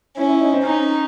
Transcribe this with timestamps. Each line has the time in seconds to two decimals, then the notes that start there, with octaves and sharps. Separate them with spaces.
0.17 C#4 E4
0.29 E4
0.41 D#4
0.53 C4
0.63 C#4 D#4